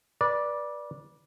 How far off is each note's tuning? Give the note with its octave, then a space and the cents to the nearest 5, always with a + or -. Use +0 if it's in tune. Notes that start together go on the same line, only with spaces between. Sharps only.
B4 -30 D5 +0